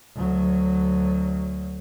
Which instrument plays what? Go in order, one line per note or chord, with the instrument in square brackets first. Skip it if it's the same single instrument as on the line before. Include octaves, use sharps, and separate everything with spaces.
[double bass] D2 F#3